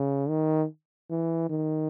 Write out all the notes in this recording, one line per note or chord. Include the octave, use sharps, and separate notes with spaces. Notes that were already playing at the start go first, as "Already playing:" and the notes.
Already playing: C#3
D#3
E3
D#3